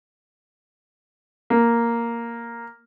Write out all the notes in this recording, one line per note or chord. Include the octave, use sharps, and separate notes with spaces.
A#3